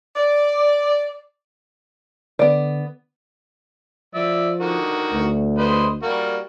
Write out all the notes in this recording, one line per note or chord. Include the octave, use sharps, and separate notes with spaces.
D5
D3 B3 D5
F3 D5 E5
D3 D#3 F#4
D2
B4 C5 D#5
G3 A#3 F#4